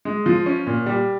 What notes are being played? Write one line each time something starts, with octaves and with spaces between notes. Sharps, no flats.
G#3
F3
C#4
A#2
G3